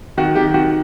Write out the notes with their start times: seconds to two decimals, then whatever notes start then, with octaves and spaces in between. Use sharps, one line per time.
0.18 D#3 F#4
0.35 D#3 G4
0.54 D#3 F#4